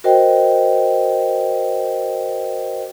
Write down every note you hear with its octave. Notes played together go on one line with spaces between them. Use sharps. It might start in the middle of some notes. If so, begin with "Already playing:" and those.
F#4 A#4 C5 D#5 G5